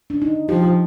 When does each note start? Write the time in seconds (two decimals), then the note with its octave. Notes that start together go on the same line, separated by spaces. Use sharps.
0.10 D4
0.22 D#4
0.48 F3 G4